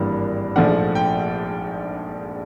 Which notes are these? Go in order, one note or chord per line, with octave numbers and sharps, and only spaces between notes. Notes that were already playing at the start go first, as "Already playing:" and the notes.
Already playing: G#1 G2 E3 G3 A#3
A#1 G#2 F3 A3 D4 F#5
G5